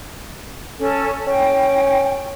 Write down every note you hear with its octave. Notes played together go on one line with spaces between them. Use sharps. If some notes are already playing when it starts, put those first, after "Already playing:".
C#4 A4
C#4 G5